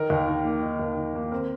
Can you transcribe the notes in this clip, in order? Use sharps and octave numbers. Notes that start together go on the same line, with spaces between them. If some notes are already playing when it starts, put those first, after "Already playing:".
Already playing: D#3 D#4 A#4
D#2
D#3
A#3
D#4
D#2
D#3
A#3
C4 A#4